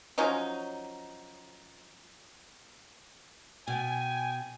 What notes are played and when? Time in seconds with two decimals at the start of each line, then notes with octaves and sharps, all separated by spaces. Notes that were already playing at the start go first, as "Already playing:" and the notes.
0.18 F3 F#3 C#4 D#4
3.68 B2 G5 G#5